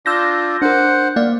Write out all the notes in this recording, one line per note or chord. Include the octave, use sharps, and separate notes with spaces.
D4 F4 E6 G6 A#6
D4 A#4 C5 F#5
A#3 D5 F5